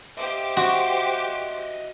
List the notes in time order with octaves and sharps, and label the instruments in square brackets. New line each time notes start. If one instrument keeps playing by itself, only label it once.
[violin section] G4 C5 D6 [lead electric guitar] D#5 E5
[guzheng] F#4 [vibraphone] C6